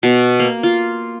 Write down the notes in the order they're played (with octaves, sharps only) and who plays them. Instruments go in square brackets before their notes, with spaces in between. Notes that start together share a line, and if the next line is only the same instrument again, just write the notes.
[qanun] B2
A#3
F4